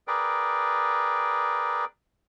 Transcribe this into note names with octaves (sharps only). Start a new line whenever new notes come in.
G#4 A#4 B4 D5 G5